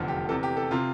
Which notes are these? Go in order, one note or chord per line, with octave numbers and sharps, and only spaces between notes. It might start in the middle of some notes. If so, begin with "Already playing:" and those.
Already playing: F1 E2 D3 F3
G4
E2 C3 E3 A4
G4
A4
C3 F4